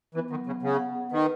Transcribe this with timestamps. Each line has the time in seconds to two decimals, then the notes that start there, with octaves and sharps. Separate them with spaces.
0.15 E3 B3
0.31 D#3 F#3
0.46 C#3 B3
0.62 C#3 F#5
0.78 F#5
0.95 G#4
1.11 D#3 B4